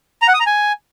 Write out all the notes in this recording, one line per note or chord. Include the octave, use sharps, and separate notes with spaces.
A#5
F#5
D#6
A#5
G#5